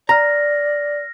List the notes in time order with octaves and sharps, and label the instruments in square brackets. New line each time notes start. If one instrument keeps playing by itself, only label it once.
[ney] D5 [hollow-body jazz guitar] A#5 [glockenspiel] F6 A#6